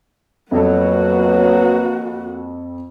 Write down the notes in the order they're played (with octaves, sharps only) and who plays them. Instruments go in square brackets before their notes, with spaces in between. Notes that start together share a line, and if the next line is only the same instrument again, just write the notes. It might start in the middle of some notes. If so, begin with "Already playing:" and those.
[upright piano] F2 A4 [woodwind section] B2 F#3 [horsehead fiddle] A#3 F#4